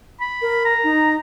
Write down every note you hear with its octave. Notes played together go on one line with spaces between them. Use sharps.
B5
A#4
A#5
D#4